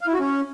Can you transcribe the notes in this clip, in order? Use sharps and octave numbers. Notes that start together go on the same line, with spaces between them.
F5
E4
F#4
C#4